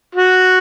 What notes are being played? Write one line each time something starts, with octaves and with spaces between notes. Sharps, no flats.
F#4